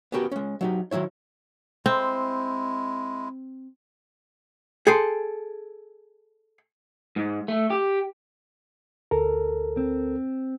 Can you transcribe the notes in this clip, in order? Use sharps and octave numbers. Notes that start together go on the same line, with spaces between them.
B3 C#4 F#4 G4 A#4
G#3 C#4
F#3 D#4 G4
D#3 F3 F#3 E4 C#5
G#3 C4 E4
G#4 A4 G5 C6
G#2
A3
G4
D2 A4 A#4
C4